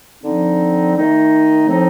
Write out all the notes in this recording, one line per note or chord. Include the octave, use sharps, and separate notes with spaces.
D3 F3 C4 D#4
D#3 A3 D#4
A2 F3 C4 D#4